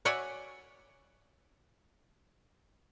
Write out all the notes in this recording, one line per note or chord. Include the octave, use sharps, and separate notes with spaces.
F#4 C#5 D5 E5 F#5 G#5